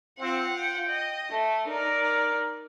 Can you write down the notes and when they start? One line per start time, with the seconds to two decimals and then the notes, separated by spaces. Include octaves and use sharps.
0.20 C4 F4 F#5
0.49 G5
0.89 D#5
1.30 A3
1.68 D#4 A#4 D5